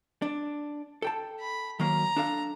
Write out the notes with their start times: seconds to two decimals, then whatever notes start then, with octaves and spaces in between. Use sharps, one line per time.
0.22 D4
1.02 A4 G5 A5
1.40 B5
1.80 D#3 F#3 A#3 A#5
2.16 D4 A4 F5